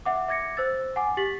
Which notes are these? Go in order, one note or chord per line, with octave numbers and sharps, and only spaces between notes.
E5 F#5 D6
E5 D6 G#6 A#6 C#7
C5 E6 A6
F#5 G#5 D6
G4 A6 B6 F#7